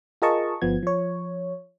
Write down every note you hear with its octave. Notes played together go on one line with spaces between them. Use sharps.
F4 G#4 A#4 D#5 A5 C#6
G1 F3 B3 G#6
F3 C#5